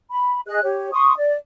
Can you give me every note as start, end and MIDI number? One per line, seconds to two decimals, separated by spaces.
0.10 0.41 83
0.48 0.62 68
0.48 0.62 75
0.48 0.62 90
0.63 0.90 67
0.63 0.90 73
0.93 1.13 84
0.93 1.13 85
0.93 1.13 87
1.17 1.36 74